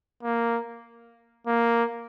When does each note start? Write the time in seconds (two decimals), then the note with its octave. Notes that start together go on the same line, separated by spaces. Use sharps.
0.23 A#3
1.47 A#3